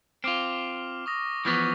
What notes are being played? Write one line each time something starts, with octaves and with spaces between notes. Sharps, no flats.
C4 F4 D6 F6
C#6 D#6 A#6
E3 F3 B3 C#6 D#6 A#6